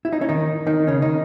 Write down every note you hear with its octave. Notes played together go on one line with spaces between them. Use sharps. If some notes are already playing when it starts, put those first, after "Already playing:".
E4
D#4
C#4
D#3 D#4
D#3 D#4
C#3 C#4
D#3 D#4